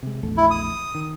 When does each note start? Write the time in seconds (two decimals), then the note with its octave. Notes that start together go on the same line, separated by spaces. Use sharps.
0.03 C3 G#3
0.23 A#1 E2 A3
0.37 E4
0.51 D#6
0.95 D#3